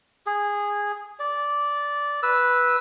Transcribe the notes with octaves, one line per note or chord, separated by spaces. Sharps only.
G#4
D5
B4 E6